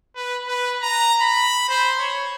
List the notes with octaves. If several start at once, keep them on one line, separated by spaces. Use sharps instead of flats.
B4
B4
A#5
B5
C5
C#5